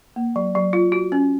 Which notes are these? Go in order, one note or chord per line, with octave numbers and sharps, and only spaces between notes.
A#3
F#3
F#3
F4
F#4
C#4